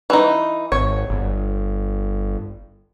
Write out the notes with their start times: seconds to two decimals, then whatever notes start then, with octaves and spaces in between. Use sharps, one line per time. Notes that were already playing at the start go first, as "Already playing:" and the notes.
0.10 E3 D#4
0.72 G#1 C#5
1.10 G1